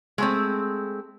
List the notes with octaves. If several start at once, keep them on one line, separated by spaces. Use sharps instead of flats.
G#3 A3 C4